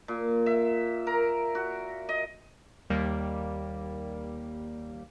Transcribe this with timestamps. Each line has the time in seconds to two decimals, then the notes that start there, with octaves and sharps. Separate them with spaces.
0.08 A#2
0.46 E5
1.07 A#4
1.55 F#4
2.09 D#5
2.90 D#2 G3 A#3